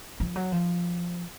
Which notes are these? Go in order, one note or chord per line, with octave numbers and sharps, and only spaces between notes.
F3
F#3
F3